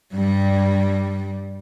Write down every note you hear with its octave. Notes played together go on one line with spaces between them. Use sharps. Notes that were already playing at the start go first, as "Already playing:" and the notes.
G2 G3